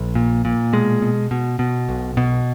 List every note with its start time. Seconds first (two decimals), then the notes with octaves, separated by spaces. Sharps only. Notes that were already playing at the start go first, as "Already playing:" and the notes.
Already playing: A#1
0.15 A#2
0.45 A#2
0.73 B2 G#3
1.02 B2
1.31 B2
1.59 B2
1.89 B1
2.17 B2